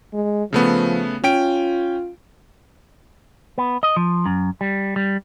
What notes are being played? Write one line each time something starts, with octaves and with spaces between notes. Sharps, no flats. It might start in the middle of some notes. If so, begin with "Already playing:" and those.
G#3
C#3 F3 A3 B3
C#4 F4 G5 D7
B3
D#5
F3
F#2
G3
G3